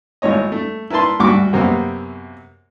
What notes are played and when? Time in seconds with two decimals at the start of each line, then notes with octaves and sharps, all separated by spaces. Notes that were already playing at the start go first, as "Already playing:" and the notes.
0.22 G#1 A2 C#5 D#5
0.52 A3
0.90 E4 A#4 B4 A5 C6
1.19 G#1 D2 G2 F#4 C#6 D6
1.53 F#2 C3 A#3 B3